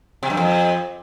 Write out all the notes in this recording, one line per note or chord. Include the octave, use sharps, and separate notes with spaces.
C3
G2
F2